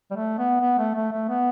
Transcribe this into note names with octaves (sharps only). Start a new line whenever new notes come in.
G3
A3
B3
B3
A3
A3
A3
B3